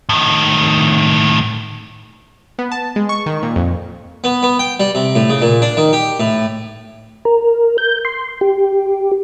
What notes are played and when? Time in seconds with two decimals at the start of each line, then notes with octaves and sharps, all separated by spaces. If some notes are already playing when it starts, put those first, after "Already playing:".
0.09 A2 D#3
2.59 B3
2.72 A5
2.96 G#3
3.09 C#6
3.26 D#3
3.43 A#2
3.56 F2
4.24 B3
4.43 B3
4.59 G5
4.80 G3
4.95 C3
5.15 A2
5.30 C#3
5.42 A#2
5.62 D4
5.77 D#3
5.93 G4
6.20 A2
7.25 A#4
7.78 G6
8.05 C6
8.41 G4